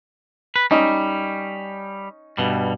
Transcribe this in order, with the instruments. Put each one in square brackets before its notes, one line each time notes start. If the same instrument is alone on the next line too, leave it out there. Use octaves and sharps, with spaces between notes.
[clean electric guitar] B4
[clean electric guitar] G3 [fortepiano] C#4 D#4 D#5
[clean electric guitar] G2 B2 G3